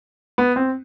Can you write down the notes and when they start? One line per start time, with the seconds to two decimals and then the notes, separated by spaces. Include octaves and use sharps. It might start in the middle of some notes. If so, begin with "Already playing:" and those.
0.38 B3
0.56 C4